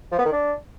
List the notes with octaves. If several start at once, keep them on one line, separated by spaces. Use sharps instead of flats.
F3
B3
D#3
D4